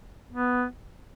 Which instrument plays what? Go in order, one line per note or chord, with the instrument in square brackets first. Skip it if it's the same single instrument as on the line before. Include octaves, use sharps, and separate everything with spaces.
[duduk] B3